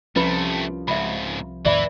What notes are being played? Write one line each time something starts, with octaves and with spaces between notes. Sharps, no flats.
C2 C3 F3 A3 C#4 E4 B4 B5
C#2 G#2 E5 B5
E2 A2 D#3 E3 D5 E5 B5